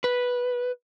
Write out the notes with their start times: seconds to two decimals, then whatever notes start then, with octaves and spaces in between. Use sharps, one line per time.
0.04 B4